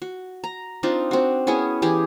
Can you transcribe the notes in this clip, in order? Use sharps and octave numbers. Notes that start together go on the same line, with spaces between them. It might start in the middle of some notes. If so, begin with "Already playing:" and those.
F#4
A#5
C4 D4 D#4 F4
C4 F#4
B3 C#4 E4 G#4
E3 G4 G#4